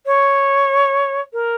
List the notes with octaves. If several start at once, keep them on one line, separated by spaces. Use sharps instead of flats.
C#5
A#4